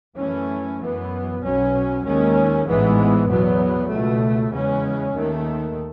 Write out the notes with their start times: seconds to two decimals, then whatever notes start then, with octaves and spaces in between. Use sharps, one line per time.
0.18 F#2 E3 A3 C#4
0.80 F#2 E3 B3
1.42 B1 B2 F#3 C#4
2.04 D#2 D#3 G#3 C#4
2.66 A1 G#2 E3 G#3 B3
3.28 E2 B2 F#3 B3
3.90 C#2 B2 A3
4.52 E2 C#3 G#3 C#4
5.14 D#2 D#3 A3